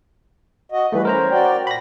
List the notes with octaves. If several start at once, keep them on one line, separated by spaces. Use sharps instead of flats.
F#4 D#5
E3 G3 A3 B4
C#4 A#4 C5 A#5
F#4 D5 G5
A#2 B5 A#6